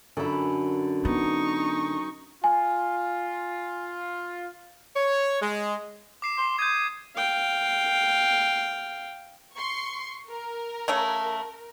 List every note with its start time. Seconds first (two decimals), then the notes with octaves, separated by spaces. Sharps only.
0.17 F#2 D3 E5 B5
1.05 B3 D#4 C#6
2.44 F4 G#5
4.95 C#5
5.41 G#3
6.22 D6 C7 E7
6.38 C6
6.59 D#6 G6 G#6
7.16 F5 G5
9.54 C6 C#6
10.29 A#4
10.88 C#3 A3 C#5